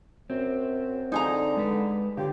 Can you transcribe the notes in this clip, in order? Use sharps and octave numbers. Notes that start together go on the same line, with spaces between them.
F#2 C4
D3 D#4 G#4 A#5
G#3 B4
D3 F#3 F4 G4